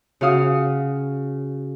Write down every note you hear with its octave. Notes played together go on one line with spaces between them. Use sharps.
C#3 F#4 F5 D#6